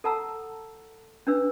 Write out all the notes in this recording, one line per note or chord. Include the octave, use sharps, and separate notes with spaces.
A4 F#5 A5 A#5 E6
C#4 D4 B4 E6